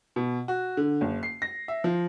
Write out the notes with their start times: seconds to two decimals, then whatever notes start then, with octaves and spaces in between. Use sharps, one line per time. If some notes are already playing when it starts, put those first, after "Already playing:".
0.16 B2
0.48 F#4
0.77 D3
1.01 F#1
1.23 C7
1.42 A#6
1.68 E5
1.84 F3